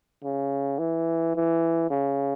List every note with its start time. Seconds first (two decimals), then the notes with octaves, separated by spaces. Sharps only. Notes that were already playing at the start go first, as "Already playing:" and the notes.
0.24 C#3
0.79 E3
1.35 E3
1.90 C#3